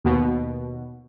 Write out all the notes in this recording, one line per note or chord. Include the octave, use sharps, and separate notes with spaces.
D#2 B2